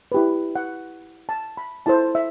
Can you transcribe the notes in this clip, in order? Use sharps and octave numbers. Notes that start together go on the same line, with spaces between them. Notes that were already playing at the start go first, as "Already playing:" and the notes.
E4 G4 B4
F#5
A5
B5
E4 A4 C5 A5
E5